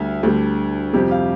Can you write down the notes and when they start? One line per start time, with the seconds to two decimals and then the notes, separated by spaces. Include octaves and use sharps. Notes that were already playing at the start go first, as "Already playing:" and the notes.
Already playing: D2 D3 G3
0.23 D2 D3 G3
0.93 F2 C3 G3 G4
1.11 F5